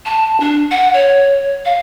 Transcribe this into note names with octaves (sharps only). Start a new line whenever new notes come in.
A5
D4
F#5
C#5
F5